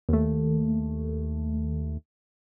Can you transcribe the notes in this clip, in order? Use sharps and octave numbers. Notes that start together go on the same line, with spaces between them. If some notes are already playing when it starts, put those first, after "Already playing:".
D#2 A3